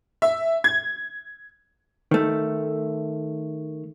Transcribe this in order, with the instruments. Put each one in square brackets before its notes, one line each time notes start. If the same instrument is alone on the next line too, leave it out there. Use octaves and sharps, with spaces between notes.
[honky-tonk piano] E5
G#6
[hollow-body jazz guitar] D#3 A3